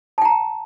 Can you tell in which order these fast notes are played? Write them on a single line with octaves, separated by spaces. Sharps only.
A5 G5 A#5